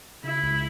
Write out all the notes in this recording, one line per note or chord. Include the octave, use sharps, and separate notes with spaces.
C#3 E4
C#2